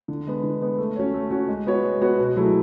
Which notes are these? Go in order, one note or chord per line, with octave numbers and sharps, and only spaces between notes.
D3
G#3 B3
D3
G#3 B3
A3
C#4 F#4 C#5
A3
C#4 F#4 C#5
G#3
B3 F#4 C#5
G#3
B3 F#4 C#5
B2
F#3 A3 E4 G#4